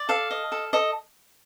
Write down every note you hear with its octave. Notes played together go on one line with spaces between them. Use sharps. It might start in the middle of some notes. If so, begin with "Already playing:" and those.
Already playing: D5
A4 F5
D#5
A4
A4 D#5